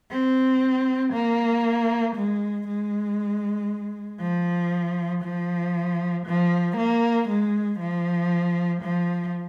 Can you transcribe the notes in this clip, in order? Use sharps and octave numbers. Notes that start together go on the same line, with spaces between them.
C4
A#3
G#3
G#3
F3
F3
F3
A#3
G#3
F3
F3